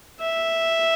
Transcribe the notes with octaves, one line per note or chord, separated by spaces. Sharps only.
E5